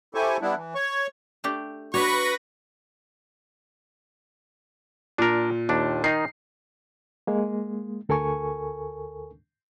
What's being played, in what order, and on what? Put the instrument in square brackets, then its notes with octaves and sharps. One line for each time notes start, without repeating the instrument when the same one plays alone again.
[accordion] E4 G4 A4 C5 G#5 C#6
G3 B3 D4 E4
E3
C#5 C#6
[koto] A3 D4 G4
[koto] D4 C#5 [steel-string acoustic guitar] F#4 [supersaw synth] B4 B5 A#6 [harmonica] C#6
[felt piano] A#2 [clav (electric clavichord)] D4 A#4
[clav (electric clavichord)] D#2 D4
[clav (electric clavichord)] D#3 D#4 [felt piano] C7
[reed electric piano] G#3 A#3
D2 A4 A#4 G#5 C#6